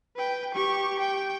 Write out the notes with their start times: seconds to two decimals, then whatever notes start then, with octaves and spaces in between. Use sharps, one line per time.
0.16 B4 G5
0.54 G4 C#6
1.00 G5